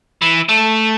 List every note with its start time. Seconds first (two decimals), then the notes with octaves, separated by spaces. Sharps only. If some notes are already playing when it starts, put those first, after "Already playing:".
0.22 E3
0.49 A3